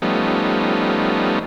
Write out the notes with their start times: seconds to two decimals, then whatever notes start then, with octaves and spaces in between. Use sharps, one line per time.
0.02 F3 G3 A3 B3 C#4 D#4